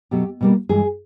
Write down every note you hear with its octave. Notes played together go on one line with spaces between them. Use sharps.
B2 F#3 A3 G4
B2 G3 A#3
G2 E3 G#3 G#4